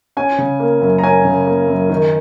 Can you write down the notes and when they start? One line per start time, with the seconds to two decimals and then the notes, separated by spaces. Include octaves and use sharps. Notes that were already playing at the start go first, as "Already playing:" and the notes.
0.17 C#4 G#5
0.38 C#3
0.60 A#3
0.81 F#2
0.98 A#5
1.03 C#4 G#5
1.25 C#3
1.47 A#3
1.68 F#2
1.90 D#3